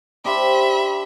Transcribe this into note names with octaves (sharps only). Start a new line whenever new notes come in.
D4 G4 C5 E5 B5